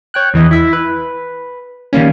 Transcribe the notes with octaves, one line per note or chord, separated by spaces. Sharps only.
C#5 G5 F#6
E2 E3 D#5
E4 E5
B4
D#3 G3 A#3 C#4